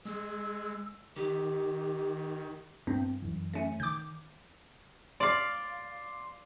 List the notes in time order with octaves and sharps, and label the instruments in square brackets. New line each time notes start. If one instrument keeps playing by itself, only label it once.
[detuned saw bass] G#3 [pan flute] E6
[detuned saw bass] D#3 [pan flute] G4
[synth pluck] G2 [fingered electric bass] B3 C4
[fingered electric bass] F#2 E3
[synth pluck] A3 C#4
[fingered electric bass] D#3 [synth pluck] D6 G6
[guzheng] D5 F5 [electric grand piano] C6 D6 C7